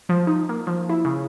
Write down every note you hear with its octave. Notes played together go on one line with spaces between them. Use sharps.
F3
D#4
A#3
F3
E4
C#3